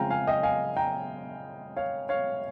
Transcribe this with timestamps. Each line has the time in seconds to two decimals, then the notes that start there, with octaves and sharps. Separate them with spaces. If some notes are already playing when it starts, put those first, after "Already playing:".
Already playing: C#3 F3 G#3 C4 F5 G5 G#5 A#5
0.10 F5 G#5
0.27 D#5 G5
0.43 F5 G#5
0.77 G5 A#5
1.76 C#5 F5
2.09 C#5 F5